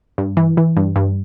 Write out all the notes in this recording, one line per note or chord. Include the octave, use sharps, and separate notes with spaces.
G2
E3
E3
G2
G2